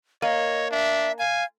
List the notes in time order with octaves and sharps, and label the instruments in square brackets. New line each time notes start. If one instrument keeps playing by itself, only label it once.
[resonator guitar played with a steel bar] A#3 [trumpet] C#5 [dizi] D#5
[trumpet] D4 [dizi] E5
[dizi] F5 [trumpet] G#5